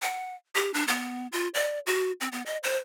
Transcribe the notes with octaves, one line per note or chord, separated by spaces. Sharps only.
F#5
G4
D4
B3
F4
D5
F#4
C4
B3
D#5
C5